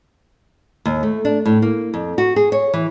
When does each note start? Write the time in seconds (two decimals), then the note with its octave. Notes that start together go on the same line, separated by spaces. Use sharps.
0.86 D#2
1.03 A3
1.25 D4
1.46 A2
1.62 A#3
1.94 F2
2.18 F#4
2.36 G#4
2.52 C#5
2.74 E3